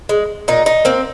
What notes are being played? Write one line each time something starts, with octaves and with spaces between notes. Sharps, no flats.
G#3
A#2 D#4
D#4
A#3 C4